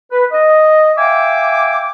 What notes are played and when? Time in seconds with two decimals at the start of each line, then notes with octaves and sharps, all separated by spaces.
0.12 B4
0.32 D#5
0.97 E5 F5 G5 G#5 D6